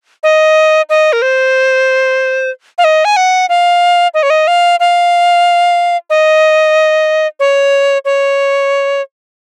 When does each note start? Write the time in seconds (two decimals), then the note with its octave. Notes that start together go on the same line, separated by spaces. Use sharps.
0.23 D#5
0.90 D#5
1.13 A#4
1.22 C5
2.78 F5
2.84 D#5
3.05 G#5
3.17 F#5
3.49 F5
4.14 D#5
4.23 C#5
4.30 D#5
4.47 F5
4.80 F5
6.10 D#5
7.40 C#5
8.05 C#5